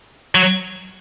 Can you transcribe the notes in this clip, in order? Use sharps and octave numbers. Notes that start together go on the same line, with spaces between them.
F#3